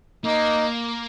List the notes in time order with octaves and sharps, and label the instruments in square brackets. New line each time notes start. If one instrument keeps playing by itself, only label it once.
[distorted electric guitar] A#3 [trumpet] D#4